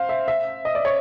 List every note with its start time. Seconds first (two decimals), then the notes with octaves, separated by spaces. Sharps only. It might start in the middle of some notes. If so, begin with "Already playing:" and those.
Already playing: C5 F5
0.09 E5
0.28 E5
0.65 D#5
0.75 D5
0.85 C#5